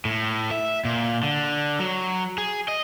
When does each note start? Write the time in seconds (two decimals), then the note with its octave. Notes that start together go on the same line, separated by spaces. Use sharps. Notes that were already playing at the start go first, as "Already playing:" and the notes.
0.05 A2
0.51 E5
0.85 A#2
1.23 D3
1.79 F#3
2.38 G#4
2.68 D#5